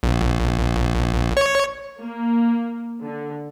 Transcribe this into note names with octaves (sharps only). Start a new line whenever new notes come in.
A#1
C#5
A#3
D3